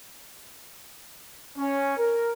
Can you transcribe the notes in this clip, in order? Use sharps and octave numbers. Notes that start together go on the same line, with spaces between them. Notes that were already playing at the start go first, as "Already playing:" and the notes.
C#4
A#4